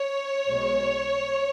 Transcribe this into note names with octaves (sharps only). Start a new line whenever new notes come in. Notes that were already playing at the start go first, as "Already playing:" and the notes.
Already playing: C#5
B1 B2 G#3